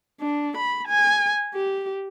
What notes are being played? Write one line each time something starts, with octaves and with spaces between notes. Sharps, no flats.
D4
B5
G#5
G4